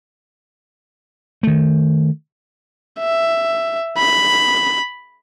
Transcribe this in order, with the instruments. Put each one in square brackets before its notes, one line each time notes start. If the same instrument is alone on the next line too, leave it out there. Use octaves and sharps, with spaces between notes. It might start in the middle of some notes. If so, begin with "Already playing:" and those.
[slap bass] D#3 A3
[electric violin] E5
B5